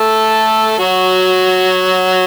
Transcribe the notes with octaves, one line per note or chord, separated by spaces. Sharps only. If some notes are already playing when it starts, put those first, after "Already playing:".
Already playing: A3 A4
F#3 F#4